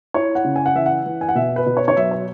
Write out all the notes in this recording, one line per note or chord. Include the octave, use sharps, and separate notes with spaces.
E4 C#5
F#5
C#3
G#5
F#5
E3 E5
F#5
E3
G#5
F#5
B2 E5
B4
B2
C#5
C#5
F#3 E5
C#5